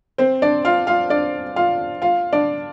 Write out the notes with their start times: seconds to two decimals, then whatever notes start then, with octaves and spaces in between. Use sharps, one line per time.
0.18 C4 C5
0.42 D4 D5
0.65 F4 F5
0.87 F4 F5
1.10 D4 D5
1.56 F4 F5
2.02 F4 F5
2.33 D4 D5